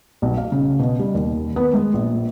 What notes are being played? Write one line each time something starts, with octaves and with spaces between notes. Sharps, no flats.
B1
F5
C#3
B2
G3
D#2
B3
G#3
A#1